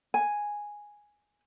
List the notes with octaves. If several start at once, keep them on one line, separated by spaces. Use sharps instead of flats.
G#5